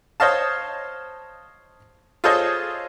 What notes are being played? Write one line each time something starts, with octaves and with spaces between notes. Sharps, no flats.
C5 C#5 D#5 F5 A5
F4 G#4 A4 C5 C#5 D#5